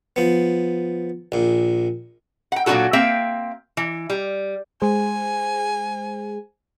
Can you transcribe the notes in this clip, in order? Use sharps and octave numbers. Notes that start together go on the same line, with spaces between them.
F3 B3
A#1 A#2
F#5 G5
A#2 F#3 C#4 D4 F#4 A4
A#3 C4 E5 G5
E3
G3
G#3 G#4 C5 G#5